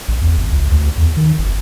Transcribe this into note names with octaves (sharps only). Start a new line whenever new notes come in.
A1
E2
G#1
C#2
D2
E2
D#3
G1